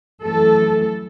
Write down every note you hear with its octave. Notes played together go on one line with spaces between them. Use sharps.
F#2 E3 A3 A4